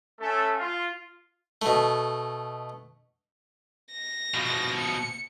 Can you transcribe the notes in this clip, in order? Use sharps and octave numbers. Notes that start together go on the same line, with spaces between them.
A3 C#4 A4
F4
B2 A3
A#6
B2 F3
C#7